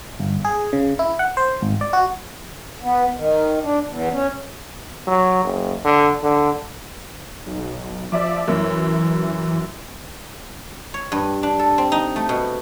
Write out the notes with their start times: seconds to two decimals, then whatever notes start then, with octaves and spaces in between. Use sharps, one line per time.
0.20 G1
0.45 G#4
0.73 C#3
0.99 E4
1.19 F#5
1.37 C5
1.62 G#1
1.81 D5
1.93 F#4
2.83 B3
3.16 D#3
3.63 D4
3.87 E2
4.12 C#4
5.07 F#3
5.44 F#1
5.85 D3
6.23 D3
7.46 B1
8.12 F3 D5 E5 D6
8.48 F#2 E3 F#3
10.94 C#5
11.12 G2
11.43 D4
11.59 A4
11.78 C4
11.92 D#4
12.16 A3
12.29 B2